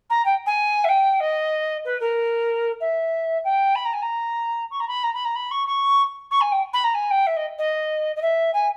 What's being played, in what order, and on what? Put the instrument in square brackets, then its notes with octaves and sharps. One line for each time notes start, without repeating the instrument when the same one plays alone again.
[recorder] A#5
G5
G#5
E5
G5
D#5
B4
A#4
E5
G5
B5
A#5
G#5
A#5
C#6
A#5
B5
A#5
B5
A#5
B5
C#6
C#6
C#6
G#5
G5
B5
A#5
G#5
G5
E5
D#5
D#5
D#5
E5
G#5